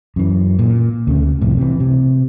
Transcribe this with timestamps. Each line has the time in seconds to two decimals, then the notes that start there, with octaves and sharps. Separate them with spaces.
0.16 F#2 E3
0.59 A#2
1.07 D2 C#3 A3
1.41 C2 F2 A2
1.57 C3 E3
1.80 C3